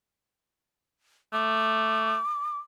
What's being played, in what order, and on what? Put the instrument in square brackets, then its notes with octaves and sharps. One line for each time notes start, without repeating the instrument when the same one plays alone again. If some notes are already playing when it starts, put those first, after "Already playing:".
[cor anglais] A3 [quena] D6